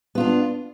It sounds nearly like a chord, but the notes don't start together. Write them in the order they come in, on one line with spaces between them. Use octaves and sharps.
B3 F4 D4